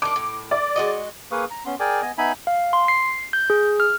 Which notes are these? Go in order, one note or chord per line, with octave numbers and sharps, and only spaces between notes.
D#3 D4 D6
A2
D5
G#3 F#4 D#5
A#3 G#4 B4 F5 C#6 D#6
A#5
B3 C#4 C6
G#4 A#4 D5 G5 G#5 D6
B3 D#5 G#5
B3 D#4 E5 G#5 B5
F5
C6
C7
G6
G#4
F6